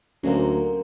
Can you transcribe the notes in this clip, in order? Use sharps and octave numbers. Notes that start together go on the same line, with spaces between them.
D2 F#3 A#3 C4 C#4